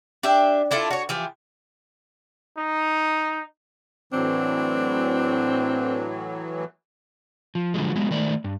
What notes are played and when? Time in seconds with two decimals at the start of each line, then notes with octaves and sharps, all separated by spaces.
0.23 D4 G4 E5
0.71 D4 E4 F4 A4
0.90 F#4 C#5
1.09 E3 F3 G4
2.58 D#4
4.13 A2 E3 F#3 C4 D4
7.55 F3
7.74 D3 F3 F#3 G#3
7.96 F#3 G#3 B3
8.11 D#3 A3 D5
8.44 G2